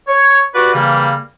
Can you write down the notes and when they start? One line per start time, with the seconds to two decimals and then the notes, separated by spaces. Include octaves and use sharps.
0.08 C#5
0.54 F#4 G4 B4 D5 F#5
0.73 C#3 E3 G3 A#3